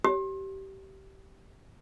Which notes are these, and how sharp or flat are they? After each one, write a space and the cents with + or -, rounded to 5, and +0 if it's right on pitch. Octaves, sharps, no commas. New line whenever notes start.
G4 -20